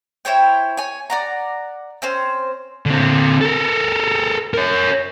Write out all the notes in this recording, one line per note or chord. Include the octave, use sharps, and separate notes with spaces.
E4 C5 C#5 G5
C#5 G#5
D5 F#5 A#5
C4 C#4 C5
D3 C4
A4 A#4
A#4 C#5